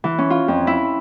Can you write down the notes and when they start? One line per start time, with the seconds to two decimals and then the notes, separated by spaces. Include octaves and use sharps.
0.04 E3
0.18 C#4
0.30 F4
0.48 F2
0.67 E4